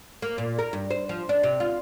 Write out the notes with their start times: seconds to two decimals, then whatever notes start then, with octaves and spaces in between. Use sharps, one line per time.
0.22 A#3
0.38 A#2
0.59 A#4
0.73 G2
0.91 C5
1.09 F3
1.29 D4
1.43 C3
1.60 F4